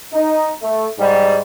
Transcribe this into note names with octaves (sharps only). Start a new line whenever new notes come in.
D#4
A3
G#2 G3